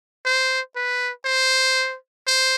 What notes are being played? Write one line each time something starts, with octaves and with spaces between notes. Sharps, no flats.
C5
B4
C5
C5